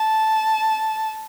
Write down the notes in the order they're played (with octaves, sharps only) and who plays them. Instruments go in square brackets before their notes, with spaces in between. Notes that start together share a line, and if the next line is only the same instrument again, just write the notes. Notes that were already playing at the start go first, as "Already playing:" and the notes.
Already playing: [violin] A5